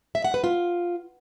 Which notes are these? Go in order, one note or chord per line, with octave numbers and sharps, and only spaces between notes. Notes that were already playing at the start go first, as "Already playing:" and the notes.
E5
F#5
B4
F4